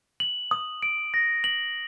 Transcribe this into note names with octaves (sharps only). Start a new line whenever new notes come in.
F#7
D#6
D7
A#6
F#7